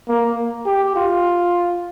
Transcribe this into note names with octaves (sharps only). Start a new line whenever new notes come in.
A#3
G4
F4